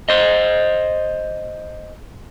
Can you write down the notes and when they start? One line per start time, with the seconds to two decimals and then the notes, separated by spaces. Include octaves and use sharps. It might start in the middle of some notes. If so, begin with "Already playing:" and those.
0.09 C5 D#5